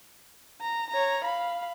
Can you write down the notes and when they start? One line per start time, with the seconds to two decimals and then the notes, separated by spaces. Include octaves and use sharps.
0.61 A#5
0.90 C#5 A#5
1.24 F5 B5